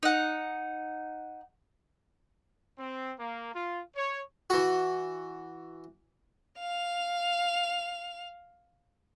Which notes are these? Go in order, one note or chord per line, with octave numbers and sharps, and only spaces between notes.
D#4 F#5
C4
A#3
F4
C#5
E3 F#4
F5 F7